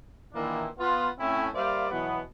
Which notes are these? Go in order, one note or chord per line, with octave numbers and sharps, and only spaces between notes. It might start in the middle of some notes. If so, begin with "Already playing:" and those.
A#2 D#3 E3 A#3 D4 E4
B3 F4
A2 A3 C4 C#4 E4
G3 A#3 C5 D5 E5 F5
B2 E3 F#3 B3